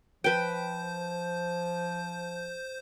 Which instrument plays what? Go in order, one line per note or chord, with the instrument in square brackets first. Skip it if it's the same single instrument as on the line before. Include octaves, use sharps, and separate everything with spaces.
[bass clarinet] F3 [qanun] B4 G5 [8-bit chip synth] C5 G6